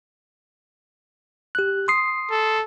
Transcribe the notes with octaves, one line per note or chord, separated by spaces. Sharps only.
G4 F#6
C6 D#6 C7
A4